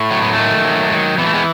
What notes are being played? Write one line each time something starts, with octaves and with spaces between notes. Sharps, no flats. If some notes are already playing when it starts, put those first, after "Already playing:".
Already playing: A2
F#3 A3
B3
D#3 A3
F#3
D#3
E3 B3
A3
G#3 B3